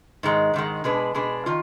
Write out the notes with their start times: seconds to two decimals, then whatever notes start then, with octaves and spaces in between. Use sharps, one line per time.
0.23 G#2 D#3 G#3
0.54 G#2 D#3 G#3
0.84 B2 G#3 D4 G#4 B4
1.15 B2 G#3 D4 G#4 B4
1.46 D#3 F4